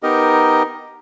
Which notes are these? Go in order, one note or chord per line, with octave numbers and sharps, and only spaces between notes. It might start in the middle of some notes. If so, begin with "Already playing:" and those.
B3 D#4 G4 A#4 D#5